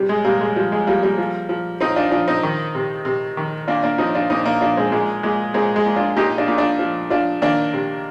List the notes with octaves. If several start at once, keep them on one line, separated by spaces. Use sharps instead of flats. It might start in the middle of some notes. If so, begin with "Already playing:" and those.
Already playing: C3 G3
G#3
C3 G3 A#3
G#3
F3 G3
G#3
F3 G3 A#3
G3 A#3
F3
F3
F3 C4 D#4
D4 F4
F3 D4 F4
C4 D#4
D#3
C3
C3
D#3
A#2 A#3 D4
A#3 D4
F3 C4 D#4
D4 F4
A#2 C4 D#4
A#3 D4
F3 A#3 D4
G#3 C4
A#2 G#3
A#2 G#3
A#2 G#3 C4
G#3
A#2
D4 F4
A#2 D#4 G4
D4 F4
A#2
D4 F4
F3
F3 D4 F4
D#3 A#3 D4
C3